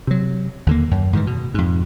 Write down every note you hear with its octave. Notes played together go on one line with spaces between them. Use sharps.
C3 F#3
D#2 D3 A#3
F#2
G#2 D#3 E3
B2
F2 G#2